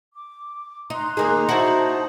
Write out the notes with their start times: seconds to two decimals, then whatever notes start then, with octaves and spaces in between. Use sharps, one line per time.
0.14 D6
0.90 D#4 A#5 C6 F#6
1.17 D#2 A#3 D#4 G#4
1.49 E4 F#4 C5 A5